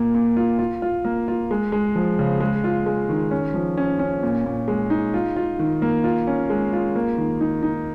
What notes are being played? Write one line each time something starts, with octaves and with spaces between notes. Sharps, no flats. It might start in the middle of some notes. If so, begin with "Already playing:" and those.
Already playing: A#2 A#3
A#2
F4
F4
F4
A#3
F4
G#3
G#3
F3
C#3
G#3
F4
G#3
D#3
C#4
F3
C#4
C#4
A#2
A#2
G#3
D#4
F4
F4
D#3
A#3
F4
C#4
G#3
F4
A#3
D#3
D#4
D#4